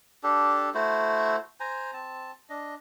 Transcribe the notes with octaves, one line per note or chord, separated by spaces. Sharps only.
D4 G4 A4
A3 E4 F#4 C5
C5 G#5 A#5
C4 A5
D4 D#5